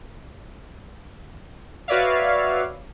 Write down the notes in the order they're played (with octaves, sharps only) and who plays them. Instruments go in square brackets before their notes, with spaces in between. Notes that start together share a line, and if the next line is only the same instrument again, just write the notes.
[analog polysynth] F#4 B4 C#5 D5 E5 F5